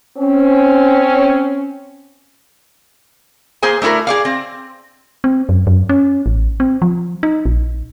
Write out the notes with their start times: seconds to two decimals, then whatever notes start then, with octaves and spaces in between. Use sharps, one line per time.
0.17 C4 C#4
3.63 A#3 G#4 C5 G#5
3.82 A3 D4 E4 F#4 A#4
4.07 G#4 D5 F5
4.25 C4
5.24 C4
5.49 F#2
5.67 F#2
5.89 C#4
6.26 A1
6.60 C4
6.82 F3
7.23 D#4
7.46 A#1